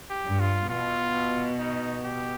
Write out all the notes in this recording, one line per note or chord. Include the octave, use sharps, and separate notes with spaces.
G4
G2
F4
B2 F4
D#4
G4